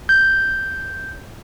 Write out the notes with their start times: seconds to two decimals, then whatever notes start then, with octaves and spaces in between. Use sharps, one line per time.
0.09 G6